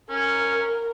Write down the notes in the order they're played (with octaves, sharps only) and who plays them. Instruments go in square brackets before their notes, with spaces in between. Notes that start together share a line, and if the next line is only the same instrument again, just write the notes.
[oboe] C#4 [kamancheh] A#4